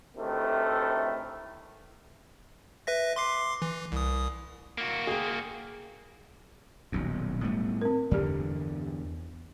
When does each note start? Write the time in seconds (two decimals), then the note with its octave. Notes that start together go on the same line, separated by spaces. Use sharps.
0.16 D2 A2 C3 D#3 E3 A3
2.87 B4 E5 A#6
3.16 C6 D6 C7
3.62 E3
3.92 C2 D#6
4.78 A#3 F#4
5.07 G#4 G5
6.92 D#1 B1 F#2
7.43 A2 G3 B3
7.81 C4 A#4
8.11 E2 G2 D3 G4 D5